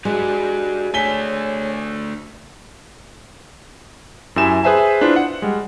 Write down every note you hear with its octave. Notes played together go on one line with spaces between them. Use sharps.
G#3 F#4 G4 B4 D5
A3 D4 C#5 G#5 B6 G7
F#2 E4 G4 E5 G#5 E7
G#4 B4 C5 E5 G#5 A5
D4 E4 F4 B4 C5
F#5
G3 G#3